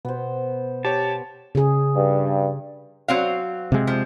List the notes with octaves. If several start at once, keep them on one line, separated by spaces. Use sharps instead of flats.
B2 B3 C5
G4 C#5 A5
C#3 G#4
G2
F#3 C4 F5
C3 G#3
F3